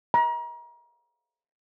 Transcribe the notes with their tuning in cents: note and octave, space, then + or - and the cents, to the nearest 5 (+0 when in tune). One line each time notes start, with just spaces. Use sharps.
A#5 +30